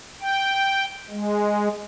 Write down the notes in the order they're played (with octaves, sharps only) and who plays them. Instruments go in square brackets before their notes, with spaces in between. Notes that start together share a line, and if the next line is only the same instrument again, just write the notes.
[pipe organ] G5
G#3